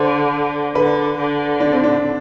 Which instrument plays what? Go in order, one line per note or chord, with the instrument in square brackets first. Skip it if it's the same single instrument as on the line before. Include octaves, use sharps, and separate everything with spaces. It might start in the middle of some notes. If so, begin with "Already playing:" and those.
Already playing: [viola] D3 [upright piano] C5
[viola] D3 [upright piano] B4
[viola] D3
[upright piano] D4
C4
D4